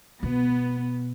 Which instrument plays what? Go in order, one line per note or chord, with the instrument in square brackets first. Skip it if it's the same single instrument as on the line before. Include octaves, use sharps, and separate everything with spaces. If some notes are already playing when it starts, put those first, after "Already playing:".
[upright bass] B2 [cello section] B3